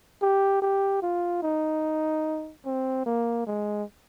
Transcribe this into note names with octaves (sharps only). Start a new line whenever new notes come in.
G4
G4
F4
D#4
C4
A#3
G#3